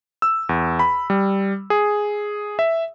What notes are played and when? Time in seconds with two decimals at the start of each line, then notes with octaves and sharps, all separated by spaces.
0.22 E6
0.49 E2
0.79 B5
1.10 G3
1.70 G#4
2.59 E5